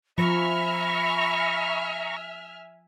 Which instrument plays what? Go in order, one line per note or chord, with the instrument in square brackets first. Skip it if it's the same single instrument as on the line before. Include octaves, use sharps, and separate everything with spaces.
[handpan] F3 [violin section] E5 G#5 F6 [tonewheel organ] A#5 C#6 [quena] B5